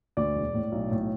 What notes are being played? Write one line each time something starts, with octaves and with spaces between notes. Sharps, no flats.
D2 D5
E1
A2
B1
A2